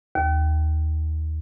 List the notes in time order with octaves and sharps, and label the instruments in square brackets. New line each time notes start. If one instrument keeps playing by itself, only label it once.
[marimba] D#2